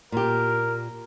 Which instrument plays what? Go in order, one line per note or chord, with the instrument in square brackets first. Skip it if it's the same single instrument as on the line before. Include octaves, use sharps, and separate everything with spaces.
[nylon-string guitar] A#2 G4 [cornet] A#4